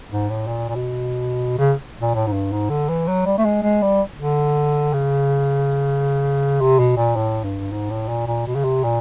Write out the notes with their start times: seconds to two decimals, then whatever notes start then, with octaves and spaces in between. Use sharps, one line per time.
0.10 G#2
0.29 A2
0.47 A#2
0.69 A#2
0.75 B2
1.58 C#3
2.01 A#2
2.15 A2
2.27 G#2
2.33 G2
2.52 G#2
2.70 D3
2.89 E3
3.08 F#3
3.26 G3
3.38 A3
3.45 G#3
3.63 G#3
3.82 G3
4.18 D3
4.93 C#3
6.61 C3
6.79 B2
6.97 A#2
7.16 A2
7.44 G2
7.72 G#2
7.90 A2
8.08 A#2
8.27 A#2
8.47 B2
8.55 C#3
8.65 C3
8.84 A#2